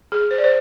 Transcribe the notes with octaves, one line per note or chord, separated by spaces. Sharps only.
G#4
C5
D5
C5